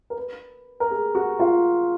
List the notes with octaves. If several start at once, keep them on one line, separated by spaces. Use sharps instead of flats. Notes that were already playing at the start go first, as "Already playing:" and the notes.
A#4
B4
A#4
G#4
F#4
F4